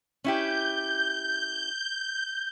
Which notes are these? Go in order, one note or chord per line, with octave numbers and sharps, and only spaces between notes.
C#4 E4 G4 G6